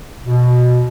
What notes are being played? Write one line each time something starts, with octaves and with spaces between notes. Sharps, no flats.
B2